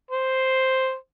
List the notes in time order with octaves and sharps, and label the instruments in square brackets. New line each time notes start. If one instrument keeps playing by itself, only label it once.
[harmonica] C5